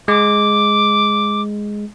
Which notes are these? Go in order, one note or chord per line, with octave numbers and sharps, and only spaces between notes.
G#3 D6